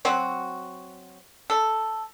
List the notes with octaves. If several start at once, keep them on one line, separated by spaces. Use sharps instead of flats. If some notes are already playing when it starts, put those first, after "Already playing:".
F#3 C4 F#4
A4